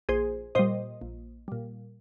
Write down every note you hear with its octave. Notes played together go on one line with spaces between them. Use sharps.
A#1 G#4 C5
A#2 G3 C5 D#5
A#1
A#2 G3